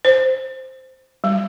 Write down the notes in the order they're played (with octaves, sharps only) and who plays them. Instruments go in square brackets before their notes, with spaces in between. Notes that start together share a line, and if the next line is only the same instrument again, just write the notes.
[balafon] C5
G3